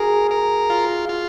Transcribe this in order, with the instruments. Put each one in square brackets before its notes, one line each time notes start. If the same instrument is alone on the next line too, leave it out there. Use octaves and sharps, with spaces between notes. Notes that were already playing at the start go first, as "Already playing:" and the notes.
Already playing: [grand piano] F#4 G#4 [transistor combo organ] A#4
[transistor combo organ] A#4
F4
F4